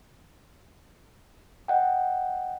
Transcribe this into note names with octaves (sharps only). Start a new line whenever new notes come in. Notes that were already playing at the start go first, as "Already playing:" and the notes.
D#5 F#5 G5